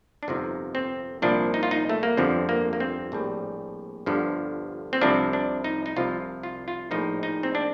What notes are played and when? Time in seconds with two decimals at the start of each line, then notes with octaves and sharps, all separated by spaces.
0.23 D4
0.28 G1 F2 C3 F3 D#4
0.75 C4
1.22 C2 A#2 F3 D4
1.54 D#4
1.63 F4
1.71 D#4
1.89 A3
2.03 A#3
2.17 G1 F2 D3 F3 C4
2.49 A#3
2.73 A#3
2.80 C4
3.12 A#1 A2 G3
4.06 G1 G2 D3 F3
4.93 C4
5.01 C2 C3 F3 D4
5.33 D4
5.64 D#4
5.86 D#4
5.96 C2 C3 F3 F4
6.43 F4
6.68 F4
6.91 A#1 A2 F3 D#4
7.23 D#4
7.43 C4
7.55 D4